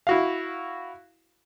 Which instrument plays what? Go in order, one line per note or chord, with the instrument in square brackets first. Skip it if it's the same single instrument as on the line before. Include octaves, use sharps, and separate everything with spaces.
[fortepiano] E4 F#4 F5